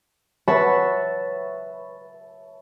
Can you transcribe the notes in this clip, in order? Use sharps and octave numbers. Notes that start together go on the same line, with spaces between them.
B4 C#5 E5 F#5 A5 B5